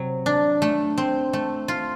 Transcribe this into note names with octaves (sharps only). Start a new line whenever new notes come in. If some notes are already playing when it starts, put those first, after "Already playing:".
Already playing: C3 F#3
D4
A3
C4
A3
F4